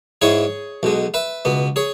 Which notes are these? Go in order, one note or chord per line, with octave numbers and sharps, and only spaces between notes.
G#2 G#3 E4 G#4 C#5
B1 B2 G#3
B4 E5
C#2 B2 B3
G#4 C#5